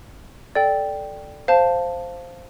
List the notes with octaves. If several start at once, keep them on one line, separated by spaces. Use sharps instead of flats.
A4 D5 G5
C5 F5 A5